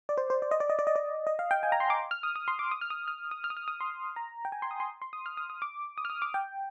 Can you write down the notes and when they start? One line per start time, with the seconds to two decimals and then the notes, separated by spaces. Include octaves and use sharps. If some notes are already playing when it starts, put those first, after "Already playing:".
0.09 D5
0.17 C5
0.30 C5
0.42 D5
0.51 D#5
0.60 D5
0.70 D#5
0.79 D5
0.87 D#5
0.96 D5
1.27 D#5
1.39 F5
1.51 G5
1.63 G#5
1.72 A#5
1.80 C6
1.90 D6
2.11 F6
2.23 D#6
2.36 D#6
2.48 C6
2.59 D6
2.71 D#6
2.81 F6
2.90 D#6
3.08 F6
3.31 D#6
3.44 F6
3.50 D#6
3.57 F6
3.68 D#6
3.81 C6
4.16 A#5
4.45 G5
4.52 G#5
4.62 C6
4.71 D#6
4.80 C6
5.02 C6
5.13 D#6
5.26 F6
5.37 D#6
5.50 D#6
5.62 D6
5.98 D#6
6.05 F6
6.10 D#6
6.22 D6
6.34 G5